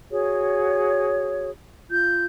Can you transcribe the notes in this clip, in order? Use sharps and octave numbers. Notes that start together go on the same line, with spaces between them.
F#4 G#4 C#5
F4 G6